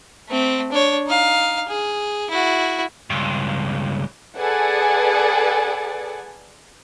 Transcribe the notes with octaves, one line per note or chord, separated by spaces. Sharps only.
A3 C4
D4 C#5
D#4 F5
G#4
E4 F#4
C#2 G2
G#4 A4 B4 D5 F#5 G#5